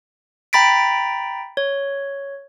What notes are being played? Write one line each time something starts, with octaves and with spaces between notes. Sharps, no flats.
G5 A#5 B5 A6 B6 D7
C#5